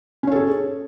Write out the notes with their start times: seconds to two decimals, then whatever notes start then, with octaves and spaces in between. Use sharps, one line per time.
0.23 C#4
0.27 C#5
0.31 A4
0.36 G#4